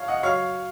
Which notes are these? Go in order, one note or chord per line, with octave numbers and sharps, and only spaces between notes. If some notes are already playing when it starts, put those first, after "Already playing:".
Already playing: F3 C#5 F5
D#5 F#5
F#3 C#5 F5